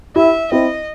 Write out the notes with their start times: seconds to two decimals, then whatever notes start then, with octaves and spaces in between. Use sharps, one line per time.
0.16 E4 G4 E5
0.52 C4 E4 D#5